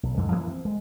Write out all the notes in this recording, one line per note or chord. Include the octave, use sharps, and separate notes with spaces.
B1
F2 G#2 D3 F#3
E3 A#3 C#4
C4
G#3